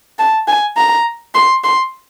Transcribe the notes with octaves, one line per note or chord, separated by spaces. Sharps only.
A5
G#5
A#5
C6
C6